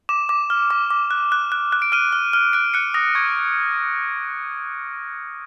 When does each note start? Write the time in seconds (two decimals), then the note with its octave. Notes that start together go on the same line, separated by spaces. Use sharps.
0.09 D6 E7
0.29 D6
0.50 F6
0.70 D6
0.90 D6
1.11 F#6
1.32 F#6
1.52 F#6
1.72 F#6
1.82 D7
1.92 F6 D#7
2.13 F6
2.33 F6
2.53 F#6 D7
2.74 F#6 C#7
2.94 D#6 A#6
3.15 C#6 G#6